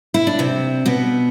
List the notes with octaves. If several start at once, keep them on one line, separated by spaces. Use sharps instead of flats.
E4
D4
C3 C4
B2 B3